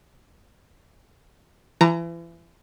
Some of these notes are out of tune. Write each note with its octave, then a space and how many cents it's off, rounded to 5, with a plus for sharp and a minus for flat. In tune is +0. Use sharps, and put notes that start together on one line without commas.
E3 +35 A#5 -10